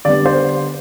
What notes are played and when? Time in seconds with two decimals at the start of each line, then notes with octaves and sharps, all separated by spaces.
0.05 D3 G3 B3 D5
0.26 C5